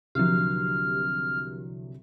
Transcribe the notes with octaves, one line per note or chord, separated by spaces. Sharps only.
C2 D3 F3 F#3 G4 F6